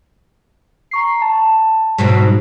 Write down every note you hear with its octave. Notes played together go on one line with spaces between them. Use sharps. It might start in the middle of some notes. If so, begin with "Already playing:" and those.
A#5 C#6 C7
A5
G#2 B2 F#3